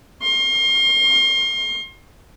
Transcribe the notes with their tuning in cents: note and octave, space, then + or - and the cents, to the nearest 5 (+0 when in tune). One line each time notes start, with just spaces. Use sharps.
C6 +35